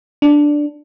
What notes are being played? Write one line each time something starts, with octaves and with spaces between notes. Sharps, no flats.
D4